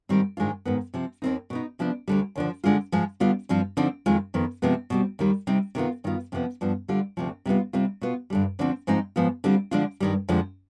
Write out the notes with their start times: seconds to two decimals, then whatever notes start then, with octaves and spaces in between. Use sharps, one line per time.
0.09 G#2 D#3 G3 C4
0.37 G#2 D#3 G#3 D4 F4
0.65 G#2 D#3 B3
0.94 C3 F3 C4
1.22 D#2 D#3 G3 C4 D#4
1.50 B2 B3 D#4
1.79 C3 F3 B3 D4
2.08 D2 D3 G3
2.35 D#2 D3 F3
2.64 D3 G#3 D4 F4
2.92 G#2 F3 G#3
3.20 D3 G3 B3 D4 F4
3.49 G2 F3 C4 F4
3.77 D3 F3 C4 D#4
4.06 F2 D#3 G#3 C4 F4
4.34 F2 D#3 B3
4.62 C3 F3 G#3 B3
4.90 B2 G3 C4
5.19 D#2 D#3 G3
5.47 C3 G3 C4 D#4
5.75 C3 D#3 B3 F4
6.04 G2 D#3 B3 F4
6.32 F2 C3 F3 B3
6.61 G2 F3 B3 F4
6.88 D3 G3 D4 F4
7.17 D2 C3 F3
7.46 C3 G3 B3 F4
7.73 C3 G3 C4 F4
8.01 B2 B3 F4
8.30 G2 D3 G3
8.59 D2 D3 F3 C4
8.87 G#2 F3 G#3 C4 D#4
9.16 G#2 F3 B3 F4
9.44 D3 G3 C4 F4
9.71 D3 F3 G#3 D4 F4
10.00 G2 D#3 G3
10.29 F2 D3 F3 G#3